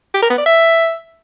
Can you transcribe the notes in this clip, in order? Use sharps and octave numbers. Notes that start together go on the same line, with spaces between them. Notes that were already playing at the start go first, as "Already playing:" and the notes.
G4
A#4
B3
D5
E5